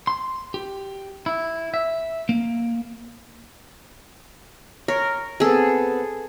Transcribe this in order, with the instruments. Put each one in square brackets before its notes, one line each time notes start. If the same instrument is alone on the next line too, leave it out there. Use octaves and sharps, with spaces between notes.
[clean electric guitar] C6
G4
E4
E5
A#3
[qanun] A#4 [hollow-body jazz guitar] C#5
[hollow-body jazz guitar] B3 C4 [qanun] G#4 A4